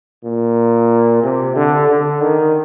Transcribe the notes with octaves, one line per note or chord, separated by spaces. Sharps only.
A#2
C3
D3
D3
D#3